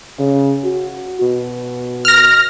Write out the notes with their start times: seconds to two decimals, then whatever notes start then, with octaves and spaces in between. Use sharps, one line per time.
0.19 C#3
0.64 F#4
1.21 B2
2.05 F6 A#6